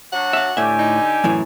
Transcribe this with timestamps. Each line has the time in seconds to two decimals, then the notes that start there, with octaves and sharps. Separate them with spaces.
0.12 F#3 D4 F#4 F#5
0.33 E5 F5
0.57 A2 D3 G4 E5 G#5
0.79 D#4
1.24 F#2 A2 E3